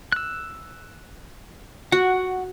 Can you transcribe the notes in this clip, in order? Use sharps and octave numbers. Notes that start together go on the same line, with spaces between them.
E6 F#6
F#4 F#5